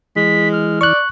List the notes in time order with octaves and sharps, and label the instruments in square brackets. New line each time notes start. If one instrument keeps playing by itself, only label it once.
[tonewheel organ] E3 [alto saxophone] G#3 [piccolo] B6
[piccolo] F6
[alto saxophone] D5 [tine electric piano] C#6 F#6